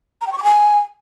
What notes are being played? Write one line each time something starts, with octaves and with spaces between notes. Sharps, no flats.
A#5
G5
C#6
D6
G#5